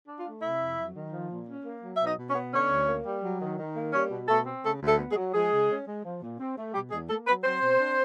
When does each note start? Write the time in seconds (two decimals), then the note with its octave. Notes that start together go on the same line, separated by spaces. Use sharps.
0.08 D4
0.19 F4 F5
0.25 A3
0.42 C3 E4 E5
0.60 F2
0.78 F#3
0.96 D#3
1.13 F3
1.30 A#2
1.48 C#4
1.65 A#3
1.83 F#3
1.95 E5
2.00 B2
2.06 D#4 D#5
2.18 B2
2.30 C#4 C#5
2.35 B3
2.53 D3 C#4 C#5
2.70 D2
2.88 A#3
3.06 G3
3.23 F#3
3.42 D#3
3.59 D#3
3.76 A#3
3.93 G3 C#4 C#5
4.11 B2
4.28 B2 A3 A4
4.46 C4
4.63 C#3 A3 A4
4.81 D2
4.87 A3 A4
4.98 B3
5.11 G#3 G#4
5.16 F#3
5.34 F3 G#3 G#4
5.52 C#3
5.70 C#4
5.86 G#3
6.04 F3
6.22 A#2
6.39 C4
6.57 A3
6.74 B2 G3 G4
6.91 E2 G#3 G#4
7.09 A3 A#3 A4
7.27 F#3 B3 B4
7.44 F#3 C4 C5
7.62 B2
7.79 D4